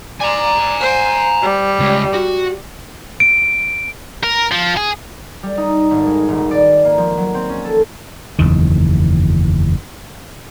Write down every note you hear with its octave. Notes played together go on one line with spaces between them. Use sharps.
D5 G#5 A#5
C5
G3
C#2
F#4
D7
A#4
F3
G#4
G3
D#4
G#1
G#3
D#1
D5
A#3
F3
F#3
C4
C#4
A4
F#1 E2 D#3